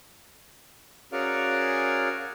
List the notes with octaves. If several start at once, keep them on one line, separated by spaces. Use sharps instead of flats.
C#4 F#4 G#4 A#4 D5 F5